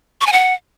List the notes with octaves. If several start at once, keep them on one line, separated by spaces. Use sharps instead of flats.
C#6
G#5
F#5